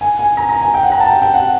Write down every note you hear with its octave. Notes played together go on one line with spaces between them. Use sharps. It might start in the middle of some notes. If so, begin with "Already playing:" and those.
G#5
G#5
A#5
A#5
G#5
G5
F#5
A#5
A5
G5
G5
F#5